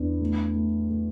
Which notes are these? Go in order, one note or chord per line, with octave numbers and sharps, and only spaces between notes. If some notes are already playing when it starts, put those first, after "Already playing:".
Already playing: E2 D4
A3
A3
A3